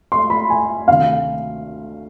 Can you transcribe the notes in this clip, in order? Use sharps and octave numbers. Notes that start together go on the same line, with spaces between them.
C6
B5
G#5
D2 C3 D#3 F5